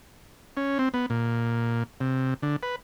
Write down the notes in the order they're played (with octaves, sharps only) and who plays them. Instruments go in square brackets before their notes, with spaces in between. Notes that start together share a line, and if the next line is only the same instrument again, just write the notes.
[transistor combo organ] C#4
C4
B3
A#2
C3
D3
B4